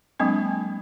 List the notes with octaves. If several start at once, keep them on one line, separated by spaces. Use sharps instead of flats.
F#3 G#3 A#3 C4 D4